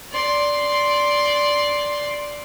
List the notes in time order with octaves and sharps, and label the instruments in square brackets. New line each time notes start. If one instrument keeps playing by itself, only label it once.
[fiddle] D5 C6